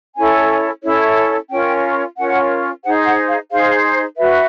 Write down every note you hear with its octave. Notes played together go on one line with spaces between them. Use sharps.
C#4 E4 A4 C#5 G#5
C#4 E4 A4 C#5
C#4 F4 A#4 C#5 G5
C#4 F4 A#4 C#5 F#5
D#4 G#4 C5 F#5
F#5
F5
D#4 G#4 C5 F5
F#4 B4 E5